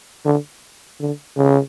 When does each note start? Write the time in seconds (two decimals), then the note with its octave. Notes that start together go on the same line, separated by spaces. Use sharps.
0.26 D3
1.00 D3
1.37 C#3